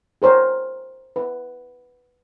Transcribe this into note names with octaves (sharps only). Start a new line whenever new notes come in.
G#4 A#4 C5 C#5
B4